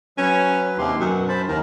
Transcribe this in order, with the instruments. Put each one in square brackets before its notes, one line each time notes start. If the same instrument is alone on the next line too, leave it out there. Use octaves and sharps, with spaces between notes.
[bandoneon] F#3 B4 [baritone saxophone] C#4
[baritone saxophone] D#2 [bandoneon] C3 G4 C6
[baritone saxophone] F#2 [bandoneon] B2
[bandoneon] C5 A5 B5
[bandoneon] D#2 A#4 [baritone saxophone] D#3